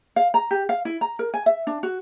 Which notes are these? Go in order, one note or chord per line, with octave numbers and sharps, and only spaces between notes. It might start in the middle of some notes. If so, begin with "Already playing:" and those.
F5
A#5
G4
F5
E4
A#5
A#4
G#5
E5
D4
F#4